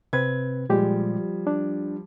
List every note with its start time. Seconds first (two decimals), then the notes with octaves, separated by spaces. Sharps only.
0.13 C3 C4 B4 G#6
0.69 A#2 F3 G3 G#3 G4
1.47 D4